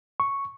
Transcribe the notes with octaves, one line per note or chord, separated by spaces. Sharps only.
C#6